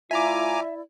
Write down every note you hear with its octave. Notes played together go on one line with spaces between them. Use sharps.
A2 E4 F4 D5 E5 G#5 A#5 D6